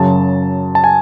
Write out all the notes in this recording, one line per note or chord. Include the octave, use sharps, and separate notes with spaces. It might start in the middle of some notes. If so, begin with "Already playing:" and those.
Already playing: F#2 C#3 F#3 A5
A5
G#5